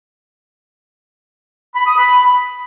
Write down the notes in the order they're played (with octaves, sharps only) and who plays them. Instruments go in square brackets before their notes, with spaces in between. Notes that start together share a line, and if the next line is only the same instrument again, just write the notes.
[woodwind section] B5
D#6
B5